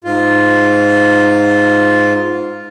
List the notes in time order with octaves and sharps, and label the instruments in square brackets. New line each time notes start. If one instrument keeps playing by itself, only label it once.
[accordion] G#2 F4